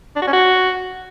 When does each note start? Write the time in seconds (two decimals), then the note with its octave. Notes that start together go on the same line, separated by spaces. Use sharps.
0.16 D4
0.22 F#4
0.27 C#4
0.33 F#4